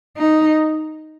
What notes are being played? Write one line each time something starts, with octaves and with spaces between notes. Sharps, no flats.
D#4